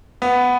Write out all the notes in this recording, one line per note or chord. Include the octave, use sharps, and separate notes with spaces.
B3